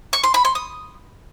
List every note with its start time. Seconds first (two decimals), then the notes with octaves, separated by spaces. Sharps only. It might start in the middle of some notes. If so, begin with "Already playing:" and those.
0.13 C#6
0.24 C6
0.34 B5
0.45 C6
0.55 D#6